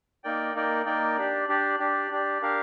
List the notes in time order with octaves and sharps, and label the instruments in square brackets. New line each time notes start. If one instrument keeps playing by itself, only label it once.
[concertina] A#3 D#4 A#4 D5 G5
A#3 D#4 A#4 D5 G5
A#3 D#4 A#4 D5 G5
D4 G4 D5
D4 G4 D5
D4 G4 D5
D4 G4 D5
D4 G4 A#4 F5